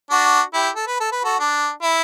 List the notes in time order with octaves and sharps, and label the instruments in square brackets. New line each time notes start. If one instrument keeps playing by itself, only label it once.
[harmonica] D4 F#4
E4 G4
A4
B4
A4
B4
F#4 A4
D4
E4